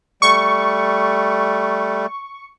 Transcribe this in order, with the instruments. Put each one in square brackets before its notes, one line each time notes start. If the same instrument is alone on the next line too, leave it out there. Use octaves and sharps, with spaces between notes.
[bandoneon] G3 A3 [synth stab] C#6